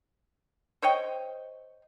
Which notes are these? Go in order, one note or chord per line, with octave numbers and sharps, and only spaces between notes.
C5 C#5 D#5 G5